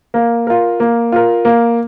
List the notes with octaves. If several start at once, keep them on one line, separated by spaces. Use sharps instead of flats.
A#3
F4 A#4
A#3
F4 A#4
A#3